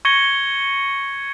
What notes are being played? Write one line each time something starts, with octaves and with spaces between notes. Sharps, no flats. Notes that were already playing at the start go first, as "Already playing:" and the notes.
C#6 G#6 A#6 C#7 G7